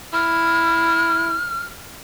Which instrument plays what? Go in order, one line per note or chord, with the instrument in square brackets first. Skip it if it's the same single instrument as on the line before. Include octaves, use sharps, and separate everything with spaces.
[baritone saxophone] E4 [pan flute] F6